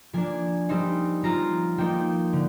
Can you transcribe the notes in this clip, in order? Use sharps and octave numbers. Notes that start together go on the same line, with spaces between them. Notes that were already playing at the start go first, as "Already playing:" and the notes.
F3 A#3 D4 G#5
G3 C4 D#4
F3 C4 F4 A#5
F3 A#3 D#4 G5
D3